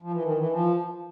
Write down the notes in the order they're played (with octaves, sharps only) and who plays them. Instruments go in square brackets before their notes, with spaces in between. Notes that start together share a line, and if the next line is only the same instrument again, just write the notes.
[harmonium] F3
E3
D#3
E3
F3